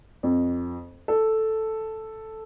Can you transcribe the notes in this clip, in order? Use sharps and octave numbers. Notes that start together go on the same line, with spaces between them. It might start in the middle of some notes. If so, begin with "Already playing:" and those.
F2
A4